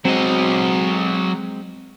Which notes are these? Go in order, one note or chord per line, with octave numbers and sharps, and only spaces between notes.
F#3 G#3 C4 D#5